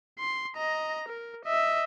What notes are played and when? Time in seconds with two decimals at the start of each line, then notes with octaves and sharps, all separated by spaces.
0.19 C6
0.56 D#5 A#5
1.08 A#4
1.45 D#5 E5